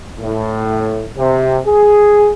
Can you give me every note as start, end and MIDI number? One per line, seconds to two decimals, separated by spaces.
0.19 1.05 45
1.17 1.57 48
1.66 2.32 68